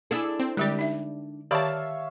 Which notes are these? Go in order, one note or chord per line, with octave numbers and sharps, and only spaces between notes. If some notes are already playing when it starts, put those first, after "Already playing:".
D4 E4 G#4 A4 E6
C4
D3 G3 G#3 G4 D5
D#4 E5
D#3 G4 C#5 D5 E5 F5 A5 B5